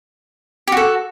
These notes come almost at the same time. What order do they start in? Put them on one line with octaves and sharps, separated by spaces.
G4 F#4 A4